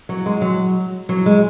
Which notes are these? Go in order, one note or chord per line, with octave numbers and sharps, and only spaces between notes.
F#3
G#3
F#3
F#3
G#3